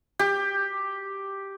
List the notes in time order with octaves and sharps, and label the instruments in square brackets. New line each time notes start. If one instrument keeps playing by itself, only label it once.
[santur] G4